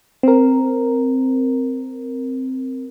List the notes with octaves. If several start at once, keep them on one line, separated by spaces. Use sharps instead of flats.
C4 A#4